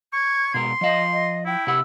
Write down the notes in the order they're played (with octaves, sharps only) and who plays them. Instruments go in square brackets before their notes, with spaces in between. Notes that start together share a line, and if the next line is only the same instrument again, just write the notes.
[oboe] C#6 [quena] G#6
[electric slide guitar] B2 G#3 A#4 [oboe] C6
[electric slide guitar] F3 F5 [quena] D#5
[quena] D#5
[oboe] E4 [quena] G5
[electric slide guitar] C3 G4 F#5 [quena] E6